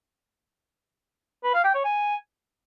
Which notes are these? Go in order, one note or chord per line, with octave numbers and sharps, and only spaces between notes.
B4
F5
G5
C#5
G#5